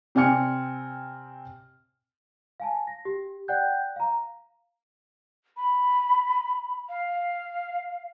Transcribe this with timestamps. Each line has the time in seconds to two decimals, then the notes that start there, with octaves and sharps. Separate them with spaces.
0.15 C3 C4 D5 G#5 F6 C#7
2.60 F5 G#5 A5
2.87 A#6
3.05 G4
3.48 D5 F#5 G5 F#6 G6
3.96 F5 A#5
5.57 B5
6.89 F5